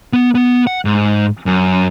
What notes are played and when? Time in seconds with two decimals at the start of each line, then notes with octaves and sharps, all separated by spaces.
0.13 B3
0.35 B3
0.67 F#5
0.85 G#2
1.46 F#2